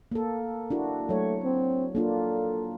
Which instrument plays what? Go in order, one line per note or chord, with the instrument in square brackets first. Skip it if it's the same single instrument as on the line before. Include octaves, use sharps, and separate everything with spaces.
[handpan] A#3 A4
[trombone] A#3 [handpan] D4 E4 F#4
[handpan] F#3 C#5 [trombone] A3
[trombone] C4
[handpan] A#3 D4 F4 [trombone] A4